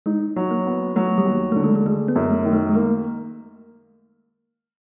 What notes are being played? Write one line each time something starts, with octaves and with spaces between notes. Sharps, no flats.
G#3 D#4
F#3
A#3
B3
F#3 A3
G3
D#2
D3 A3
G#3
G#3
G#3 A3
B3
F#2
A3
D#3
A3
G#3
A3 A#3